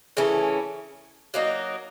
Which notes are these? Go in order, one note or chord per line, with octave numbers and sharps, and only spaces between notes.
C#3 E3 A3 C#4
F#3 A#3 D#4